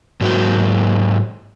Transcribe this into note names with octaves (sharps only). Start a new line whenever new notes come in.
G#2 F#3 A#3 F#4 C5